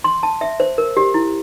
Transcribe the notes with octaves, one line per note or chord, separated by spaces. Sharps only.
C6
A5
E5
C5
A#4
G4
E4